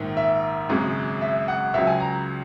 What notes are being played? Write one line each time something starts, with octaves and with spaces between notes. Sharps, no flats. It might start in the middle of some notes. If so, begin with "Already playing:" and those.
Already playing: A#1 G#2 D#3
E5
G#1 F#2 C#3 G#3
E5
F#5
C#2 C#3 F#3 E5
G#5
A#5